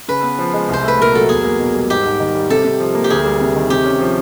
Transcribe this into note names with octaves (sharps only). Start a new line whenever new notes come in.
C#3 B4
B3
F3
G#3
C2 C5
A3 B4
A#2 A#4
F#3 A4
E2 G#4
A#3
B2
G3
G#2 G4
G#2
D#3
G3
C3 A4
C3
F3
A#3
G4
D2 G#4
G3
C3
D#3
C3 G4
C#4
F3